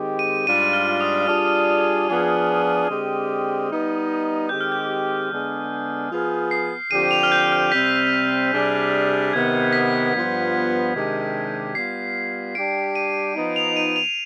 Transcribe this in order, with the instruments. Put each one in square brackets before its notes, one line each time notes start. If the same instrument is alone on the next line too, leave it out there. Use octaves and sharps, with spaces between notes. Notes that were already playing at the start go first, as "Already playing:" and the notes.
Already playing: [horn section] D#3 G#3 C4 G4
[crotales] D#7
[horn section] G#2 G3 D4 F4 [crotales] D#7
[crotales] F6
D#6
[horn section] G3 D4 F4 G#4 [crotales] F6
[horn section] F3 B3 D4 F4 G#4
D3 G#3 C4 G4
G3 B3 D#4
[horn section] D#3 G#3 C4 G4 [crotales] G6
[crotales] F6
G6
[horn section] D3 G#3 B3 D4 G#4
F3 B3 F4 G#4
[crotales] C7
[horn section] D3 F3 C4 G4 [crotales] D#7
[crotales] F7
F6
G6
F6
[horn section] C3 G3 C4 [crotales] B6
[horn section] C3 G3 D4 G#4
[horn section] C3 D#3 B3 [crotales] G#6
[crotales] B6
[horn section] G2 F3 B3 F4
C3 D#3 G#3 D4 G4
[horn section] G3 B3 F4 [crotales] C7
[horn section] G3 D4 G4 [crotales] D7
[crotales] D#7
[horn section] F3 B3 D#4
[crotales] F7
D#7
F7